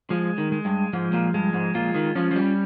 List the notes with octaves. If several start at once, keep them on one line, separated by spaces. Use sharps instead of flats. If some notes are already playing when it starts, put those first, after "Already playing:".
F3 G#3
D#3
G#3
G2
G#2 F3
A#2
G2 G#3
G#2
A#2 F4
D#3
F3 C#4
F3
G3